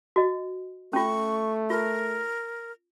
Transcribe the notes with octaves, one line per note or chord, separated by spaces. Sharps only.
F#4 D#5
A3 C#4 F4 C#6
F4 A#4